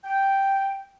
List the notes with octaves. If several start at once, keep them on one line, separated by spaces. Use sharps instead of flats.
G5